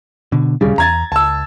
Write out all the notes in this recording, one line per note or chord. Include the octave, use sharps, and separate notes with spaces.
B2 D3
D1 C2 C#3 G3
E2 A#5 G#6 A6
C#2 A5 E6